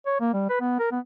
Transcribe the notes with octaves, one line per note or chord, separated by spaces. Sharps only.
C#5
A#3
G3
B4
B3
A#4
B3